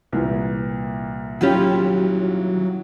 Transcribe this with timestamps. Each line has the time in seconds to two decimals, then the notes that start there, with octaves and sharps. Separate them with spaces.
0.13 C2 A#2 E3
1.41 D#3 F#3 C#4 E4 F4 G4